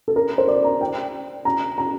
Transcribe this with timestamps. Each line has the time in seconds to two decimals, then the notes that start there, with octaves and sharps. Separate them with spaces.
0.08 A4
0.16 A#4
0.38 C5
0.48 D5
0.64 A#5
0.81 G5
1.45 A#5
1.78 A#5